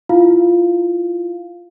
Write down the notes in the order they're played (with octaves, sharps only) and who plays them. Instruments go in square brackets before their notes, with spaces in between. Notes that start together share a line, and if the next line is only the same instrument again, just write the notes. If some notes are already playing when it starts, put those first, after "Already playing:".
[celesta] E4 F4 F5